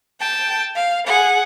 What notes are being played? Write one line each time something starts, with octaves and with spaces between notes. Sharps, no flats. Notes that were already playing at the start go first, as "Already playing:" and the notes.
G5 A5
F5
G#4 F#5